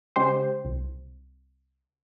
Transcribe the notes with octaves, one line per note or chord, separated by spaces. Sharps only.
C#3 G#3 G4 C5
C2